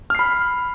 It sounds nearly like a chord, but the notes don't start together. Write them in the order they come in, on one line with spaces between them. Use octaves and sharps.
F6 C7 B5